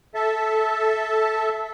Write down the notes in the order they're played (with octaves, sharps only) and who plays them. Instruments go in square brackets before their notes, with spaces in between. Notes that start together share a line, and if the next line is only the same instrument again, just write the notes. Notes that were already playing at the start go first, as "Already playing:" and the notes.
[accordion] A4 E5 A5